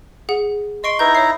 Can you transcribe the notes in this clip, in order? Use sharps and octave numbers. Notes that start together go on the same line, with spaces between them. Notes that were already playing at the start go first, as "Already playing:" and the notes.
G#4 F#5
D#5 C6 C#6 D7
D#4 E4 B4 A#5 G6
C#5 E5 C7